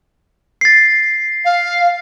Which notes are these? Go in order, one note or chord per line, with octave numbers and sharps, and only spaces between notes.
A6 C7
F5